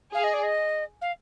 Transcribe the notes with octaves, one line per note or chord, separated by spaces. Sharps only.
G#4 F5
D#5
D5
D#5
F5